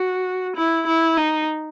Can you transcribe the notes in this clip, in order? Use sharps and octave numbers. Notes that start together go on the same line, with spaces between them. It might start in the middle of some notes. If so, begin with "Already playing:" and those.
Already playing: F#4
E4
E4
D#4